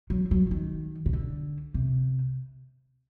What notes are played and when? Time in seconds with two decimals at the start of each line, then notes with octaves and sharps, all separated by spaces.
0.10 F#3
0.31 F#3
0.51 D#3
1.06 C#3
1.13 D3
1.74 C3